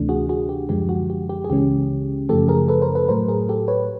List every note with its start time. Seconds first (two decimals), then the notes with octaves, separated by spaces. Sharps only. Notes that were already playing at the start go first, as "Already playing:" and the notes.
Already playing: D2 C3 E3 A3 D4
0.09 F#4 G#4
0.29 F#4 G#4
0.49 G4
0.69 F#2 D3 F3 G#3 G4
0.89 F#4
1.10 G4
1.29 G4
1.44 G#4
1.50 C#2 C#3 E3 G#3 C#4 G4
2.29 F#2 C#3 F3 A3 G4 A4
2.48 G#4 A#4
2.68 A4 B4
2.81 A#4 C5
2.95 A4 B4
3.08 A2 F#3 A3 A#4 C5
3.28 G#4 A#4
3.49 G4 A4
3.68 B4 C#5